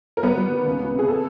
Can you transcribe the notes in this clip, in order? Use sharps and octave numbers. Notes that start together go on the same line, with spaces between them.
A#4
G3 B3 B4
G3
D#3
C#2
C#2
C3
G#4
A4